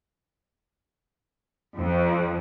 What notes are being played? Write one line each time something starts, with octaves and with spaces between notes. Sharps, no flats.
F2